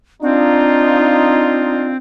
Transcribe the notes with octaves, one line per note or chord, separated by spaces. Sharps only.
C4 D4 D#4 F4